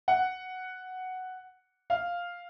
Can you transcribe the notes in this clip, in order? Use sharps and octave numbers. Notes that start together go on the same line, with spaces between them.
F#5
F5